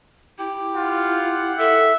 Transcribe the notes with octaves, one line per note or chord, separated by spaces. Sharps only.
E4 G4
F4 F#5
A4 E5